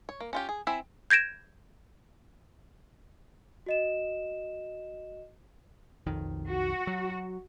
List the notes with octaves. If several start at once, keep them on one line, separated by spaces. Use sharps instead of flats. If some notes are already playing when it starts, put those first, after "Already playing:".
C#5
A#3
C#4 F4 G4
G#4
C4 E4 E5 G#5
G6 G#6 A#6 D7 E7
F#4 D#5 E7
B1 F2 D#3
F#4
F#3